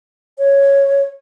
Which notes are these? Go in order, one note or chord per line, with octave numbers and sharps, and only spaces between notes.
C#5